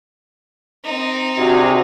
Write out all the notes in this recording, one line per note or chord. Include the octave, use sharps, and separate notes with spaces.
C4 D#4
C3 D4 F#4 G#4